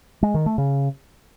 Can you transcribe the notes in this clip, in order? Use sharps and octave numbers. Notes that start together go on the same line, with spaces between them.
G#3
D#3
A3
C#3